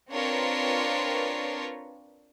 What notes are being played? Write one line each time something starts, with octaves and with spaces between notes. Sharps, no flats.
C4 D4 F4 A#4 B4 C#5